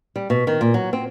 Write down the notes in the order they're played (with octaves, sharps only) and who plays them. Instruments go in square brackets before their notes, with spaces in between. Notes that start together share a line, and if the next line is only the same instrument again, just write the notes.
[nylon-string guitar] G3
B2
D#3
A#2
F#3
C4